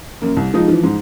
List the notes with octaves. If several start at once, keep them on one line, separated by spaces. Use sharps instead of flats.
F#2 A#3
C2
F3 G#3 D#4 F4
E3 F3
G#2